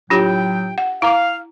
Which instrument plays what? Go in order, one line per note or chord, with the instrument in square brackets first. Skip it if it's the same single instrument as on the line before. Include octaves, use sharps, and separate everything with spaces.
[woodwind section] A2 F#3 G5 [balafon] D4 F4 G4
[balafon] F#5
[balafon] E4 A#5 D6 [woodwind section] F5